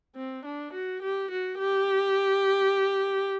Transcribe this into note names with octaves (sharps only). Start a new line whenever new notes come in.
C4
D4
F#4
G4
F#4
G4